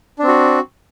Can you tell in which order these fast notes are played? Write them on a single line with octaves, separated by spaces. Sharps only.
D4 C4 F#4